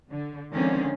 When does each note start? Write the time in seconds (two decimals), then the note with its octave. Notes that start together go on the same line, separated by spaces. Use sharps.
0.10 D3
0.53 D3 D#3 F3 G#3 C4 C#4